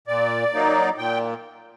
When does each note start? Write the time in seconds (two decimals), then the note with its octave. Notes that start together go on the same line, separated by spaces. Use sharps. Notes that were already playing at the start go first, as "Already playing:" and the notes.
0.08 A#2 D5
0.53 F#3 A#3 D#4
0.98 A#2 G5